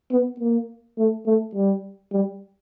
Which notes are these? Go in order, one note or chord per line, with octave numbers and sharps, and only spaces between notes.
B3
A#3
A3
A3
G3
G3